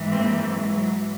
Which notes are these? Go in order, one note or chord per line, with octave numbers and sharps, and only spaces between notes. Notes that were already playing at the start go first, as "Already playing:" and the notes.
Already playing: G#2 E3
A#3 C4
F#3
F#3